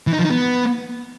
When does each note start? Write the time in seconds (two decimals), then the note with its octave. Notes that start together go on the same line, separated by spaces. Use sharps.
0.07 E3
0.13 D#4
0.19 F3
0.25 D#4
0.31 B3